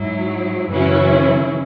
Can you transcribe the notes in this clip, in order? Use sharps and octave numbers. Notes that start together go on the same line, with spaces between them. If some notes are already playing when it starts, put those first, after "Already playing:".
Already playing: G#2 F#3 E4
F#2 C#3 E3 C#4 E4 F#4